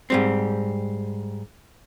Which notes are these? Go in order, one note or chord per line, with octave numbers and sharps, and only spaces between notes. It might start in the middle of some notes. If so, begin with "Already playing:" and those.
G#2 G3 C4